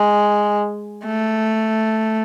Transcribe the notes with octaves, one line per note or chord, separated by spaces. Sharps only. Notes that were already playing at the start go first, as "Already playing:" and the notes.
Already playing: G#3
A3